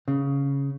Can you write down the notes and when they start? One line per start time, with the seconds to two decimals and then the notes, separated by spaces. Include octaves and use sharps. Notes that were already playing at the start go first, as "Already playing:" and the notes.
0.08 C#3